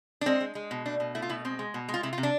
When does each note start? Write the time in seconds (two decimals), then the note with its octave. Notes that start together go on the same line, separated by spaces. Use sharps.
0.21 D4
0.26 G#3 C4
0.40 G#3
0.55 G#3
0.71 B2
0.85 A3 D4
1.00 B2
1.15 A3 E4
1.22 F4
1.29 B2 E4
1.45 G#3 C4
1.59 G#3
1.74 B2
1.88 G#3
1.94 F4
2.03 C3 E4
2.13 F4
2.18 C3
2.23 D4